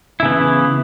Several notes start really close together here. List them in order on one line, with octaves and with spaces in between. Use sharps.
E4 C#3 B3 E3